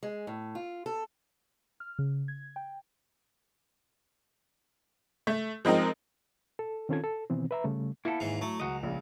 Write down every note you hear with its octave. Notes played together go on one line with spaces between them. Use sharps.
G#3
A2
F4
A4
F6
C#3
G#6
G5
A3
F3 G#3 C4 D#4 A#4
A4
D#3 C4 C#4 F4 A4 G#6
A4
B2 D#3 E3 B3 C4
B4 E5 A#5
C#3 G3 A3
A#3 B3 E4 A4
D#2 G#2 E3
F#3 A3
C#2 F#3 F#4 D#5
A#1 C#3